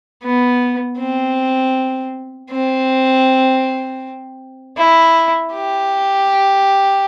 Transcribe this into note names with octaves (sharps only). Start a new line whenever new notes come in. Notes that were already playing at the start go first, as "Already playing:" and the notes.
B3
C4
C4
E4
G4